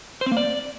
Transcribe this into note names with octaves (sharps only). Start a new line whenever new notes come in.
C5
C4
A#3
D5